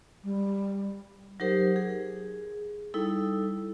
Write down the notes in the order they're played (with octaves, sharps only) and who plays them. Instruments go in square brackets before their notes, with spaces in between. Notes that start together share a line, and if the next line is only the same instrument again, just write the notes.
[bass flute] G3
[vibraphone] F#3 D#4 G4 A#4 C5
G#4
G3 D#4 E4 A4